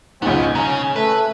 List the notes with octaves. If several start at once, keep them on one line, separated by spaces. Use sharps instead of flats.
C#2 G#2 B3 C#4 D#5
C#3 A#5
A3 B4